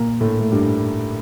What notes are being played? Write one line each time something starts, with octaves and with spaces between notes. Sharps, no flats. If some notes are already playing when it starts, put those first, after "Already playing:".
Already playing: A#2 A#3
A2 A3
A3
G2 G3